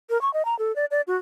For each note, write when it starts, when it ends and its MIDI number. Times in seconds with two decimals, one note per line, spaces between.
0.10 0.20 70
0.22 0.32 85
0.34 0.45 75
0.45 0.57 82
0.59 0.74 69
0.76 0.85 74
0.91 1.01 74
1.07 1.16 66